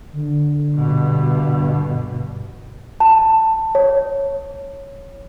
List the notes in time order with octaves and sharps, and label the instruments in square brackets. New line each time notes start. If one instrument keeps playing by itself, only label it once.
[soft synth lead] D3
[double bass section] G2 B2
[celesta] A5
C#5